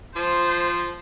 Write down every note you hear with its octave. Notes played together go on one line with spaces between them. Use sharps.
F3 C5